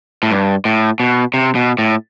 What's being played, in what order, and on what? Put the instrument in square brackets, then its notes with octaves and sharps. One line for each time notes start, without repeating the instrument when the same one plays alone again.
[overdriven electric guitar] A2
G2
A2
B2
C3
B2
A2